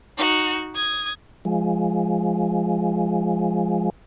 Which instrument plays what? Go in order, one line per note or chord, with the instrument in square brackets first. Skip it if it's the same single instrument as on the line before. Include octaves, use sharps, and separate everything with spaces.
[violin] D#4 F#4
D#6 G#6
[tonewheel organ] F3 G#3